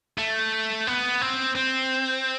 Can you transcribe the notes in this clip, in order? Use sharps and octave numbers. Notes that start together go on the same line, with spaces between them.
A3
B3
C4
C4